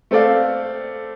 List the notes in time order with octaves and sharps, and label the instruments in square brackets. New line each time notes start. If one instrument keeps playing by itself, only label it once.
[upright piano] A3 C4 A4 D5 F5